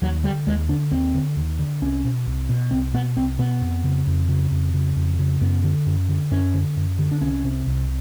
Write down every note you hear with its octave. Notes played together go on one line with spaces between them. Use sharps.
D#2 F#3
D3 G3
D#2 G#3
D3 D4
D#2 C4
D3
D#2
D3
C2 C#4
B2
C2
B2
C2 C4
B2 B3
C2 C4
B2 B3
F2
C#3
F2
C#3
F2
C#3
F2
C#3
F#2 B3
D3
F#2
D3
F#2 C#4
D3
F#2
D3
D4
C2 C#4
C3
C2